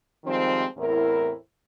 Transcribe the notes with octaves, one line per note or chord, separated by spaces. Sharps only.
D#3 F3 G3 G#3 C4
E2 A2 C4 E4 A#4